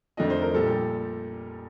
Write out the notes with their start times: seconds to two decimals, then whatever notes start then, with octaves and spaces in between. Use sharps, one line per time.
0.17 F2 D#3 A3 D4 D#5
0.30 C5
0.42 A#4
0.54 A#1 A#2 G3 A4
0.66 G4